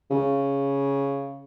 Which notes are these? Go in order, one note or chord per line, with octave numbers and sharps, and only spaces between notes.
C#3